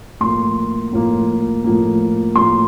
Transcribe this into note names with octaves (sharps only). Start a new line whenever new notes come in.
A2 F3 A#3 C6
A2 F3 A#3
A2 F3 A#3
A2 F3 A#3 C6